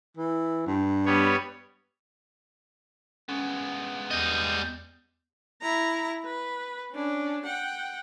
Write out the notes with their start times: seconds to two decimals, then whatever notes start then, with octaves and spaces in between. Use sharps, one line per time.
0.17 E3
0.66 G2
1.06 G3 B3 C#5
3.29 G#3 B3 C#4
4.11 E2 G3 D#5 G6
5.62 E4 A#5
6.25 B4
6.93 C#4 D4
7.45 F#5 G5